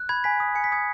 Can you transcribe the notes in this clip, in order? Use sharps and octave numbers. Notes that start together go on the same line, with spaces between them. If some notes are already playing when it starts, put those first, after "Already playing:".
Already playing: F#6
B5 G#6
G#5 B6
D#6
G#5 C#7
B6
D#6 G#6 C#7